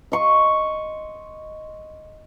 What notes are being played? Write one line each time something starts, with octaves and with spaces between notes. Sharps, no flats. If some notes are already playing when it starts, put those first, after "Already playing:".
D#5 C6 C#6